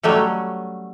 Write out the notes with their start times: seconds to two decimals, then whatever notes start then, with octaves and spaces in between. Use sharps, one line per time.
0.03 F#3 G3 A3 C#4